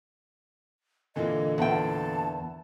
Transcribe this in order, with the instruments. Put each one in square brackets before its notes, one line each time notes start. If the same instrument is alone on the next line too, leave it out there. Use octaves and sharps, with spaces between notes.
[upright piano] A#2 D3 E3 [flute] D#5
[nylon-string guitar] E2 G5 [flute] A5